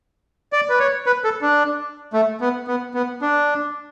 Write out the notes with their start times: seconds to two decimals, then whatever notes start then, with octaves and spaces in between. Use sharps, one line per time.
0.53 D5
0.69 B4
0.79 C#5
1.06 B4
1.24 A4
1.42 D4
2.13 A3
2.41 B3
2.68 B3
2.94 B3
3.22 D4